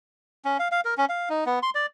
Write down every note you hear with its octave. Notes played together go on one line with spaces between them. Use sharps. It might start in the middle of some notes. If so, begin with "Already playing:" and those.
C#4
F5
F5
A#4
C#4
F5
D#4
B3
C6
D5